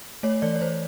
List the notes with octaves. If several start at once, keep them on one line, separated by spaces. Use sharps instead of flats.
A3 C#5
E3 D5
C#5
E3 C5